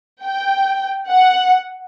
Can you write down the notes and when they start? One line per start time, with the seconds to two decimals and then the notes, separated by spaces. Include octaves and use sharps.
0.22 G5
1.09 F#5